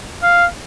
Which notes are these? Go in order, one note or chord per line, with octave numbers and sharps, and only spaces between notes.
F5